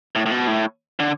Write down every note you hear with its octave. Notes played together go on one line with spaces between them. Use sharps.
A2
A2
B2
A2
D3